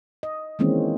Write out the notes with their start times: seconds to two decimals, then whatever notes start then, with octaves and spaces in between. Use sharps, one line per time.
0.23 D#5
0.59 D#3 E3 G#3 A#3 C4 C#4